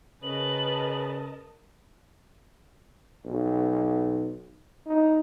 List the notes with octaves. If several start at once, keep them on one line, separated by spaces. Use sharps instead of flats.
C#3 A#4 B4 D#5 A5 F#7
B1
D#4